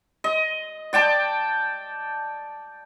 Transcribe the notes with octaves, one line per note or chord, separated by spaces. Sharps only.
D#5
D5 G5 A5 D6